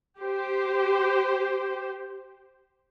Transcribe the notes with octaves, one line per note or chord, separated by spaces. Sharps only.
G4 C5